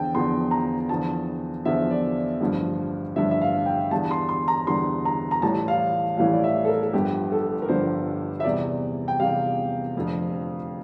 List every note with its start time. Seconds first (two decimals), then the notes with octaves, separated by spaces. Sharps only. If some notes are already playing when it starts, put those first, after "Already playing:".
Already playing: E2 D3 F3 G5 A5
0.14 E2 D3 F3 C6
0.51 A#5
0.89 E2 D3 F3 A5
1.65 E2 D3 F3 E5
1.91 D5
2.40 A1 G2 D3 F3
3.16 A1 G2 D3 F3 E5
3.31 E5
3.42 F5
3.66 G5
3.91 E2 D3 G3 A5
4.11 C6
4.29 C6
4.48 A#5
4.67 E2 D3 G3 C6
5.05 A#5
5.31 A#5
5.42 A1 A2 E3 G3 A5
5.68 F5
6.18 A1 A2 E3 G3 F5
6.33 D5
6.44 E5
6.65 A4
6.68 A#4
6.83 A4
6.93 G1 G2 D3 F3 G4
7.32 A4
7.62 A#4
7.69 G1 G2 D3 F3 C5
8.40 E5
8.44 E2 C3 G3 D5
9.08 G5
9.20 E2 C3 G3 F5
9.96 F1 F2 D3 F3